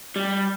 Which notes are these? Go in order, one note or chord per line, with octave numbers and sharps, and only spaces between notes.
G3